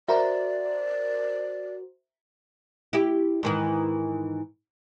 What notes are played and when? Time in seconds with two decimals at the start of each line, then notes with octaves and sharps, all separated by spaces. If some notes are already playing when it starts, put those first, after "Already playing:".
0.08 F#4 A#4 C5 D5 E5 A#5
2.93 E4 G4
3.43 G#2 D#3 E3